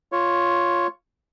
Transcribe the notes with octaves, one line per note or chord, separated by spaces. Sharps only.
F4 C#5